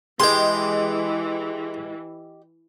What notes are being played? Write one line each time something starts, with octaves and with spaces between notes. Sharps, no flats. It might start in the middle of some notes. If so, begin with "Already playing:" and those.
E3 G#3 G4 D#5 G5 C6